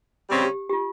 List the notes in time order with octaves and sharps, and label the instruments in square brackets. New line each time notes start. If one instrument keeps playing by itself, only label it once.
[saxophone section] C#3 G3 C4
[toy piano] G4
G4
F4